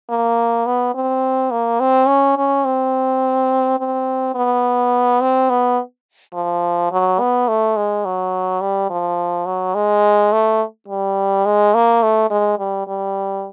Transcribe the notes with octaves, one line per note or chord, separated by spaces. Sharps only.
A#3
B3
C4
A#3
C4
C#4
C#4
C4
C4
B3
C4
B3
F3
F#3
B3
A3
G#3
F#3
G3
F3
F#3
G#3
A3
G3
G#3
A#3
A3
G#3
G3
G3